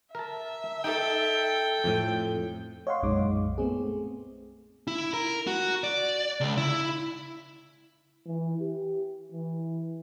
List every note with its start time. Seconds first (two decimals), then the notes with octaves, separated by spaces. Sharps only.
0.15 A#4 E5 A5
0.84 D#4 A4 G5
1.84 F2 A2
2.87 C#5 D#5 F5 F#5 C6
3.03 B1 F#2 A#2 G#3 D#4 D6
3.58 A3 B3 C4 G#4
4.87 E4
5.14 A#4
5.47 F#4
5.84 D5
6.40 C#2
6.58 E4
8.26 E3
8.60 G4
9.32 E3